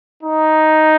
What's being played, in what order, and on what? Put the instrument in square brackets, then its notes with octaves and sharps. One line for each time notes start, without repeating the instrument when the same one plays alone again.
[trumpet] D#4